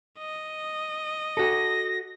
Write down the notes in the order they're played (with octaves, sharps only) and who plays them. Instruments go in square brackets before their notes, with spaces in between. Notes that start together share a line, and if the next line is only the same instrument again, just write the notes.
[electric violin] D#5
[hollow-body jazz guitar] F#4 A4 [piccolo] A#6